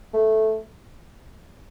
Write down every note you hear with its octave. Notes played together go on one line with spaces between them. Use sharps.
A3